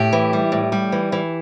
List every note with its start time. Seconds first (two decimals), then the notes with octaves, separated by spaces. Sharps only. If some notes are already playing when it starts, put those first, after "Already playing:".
Already playing: A2 G4
0.13 E3
0.33 G3
0.52 A2
0.72 G3
0.92 E3
1.12 E3